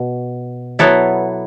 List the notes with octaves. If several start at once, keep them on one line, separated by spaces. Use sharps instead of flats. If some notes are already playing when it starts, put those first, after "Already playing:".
Already playing: B2
F#3 B3 E4 A4